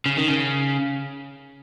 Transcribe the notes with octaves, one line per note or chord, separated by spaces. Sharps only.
C#3
D#3
C#3